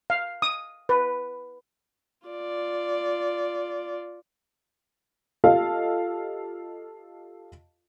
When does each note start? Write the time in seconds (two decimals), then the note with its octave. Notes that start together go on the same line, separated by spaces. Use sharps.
0.10 F5
0.42 D#6
0.89 B4
2.27 F4 D5
5.44 F4 G4 A4 D#5 F5